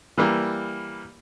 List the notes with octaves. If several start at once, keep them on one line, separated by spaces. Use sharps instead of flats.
E3 G3 A#3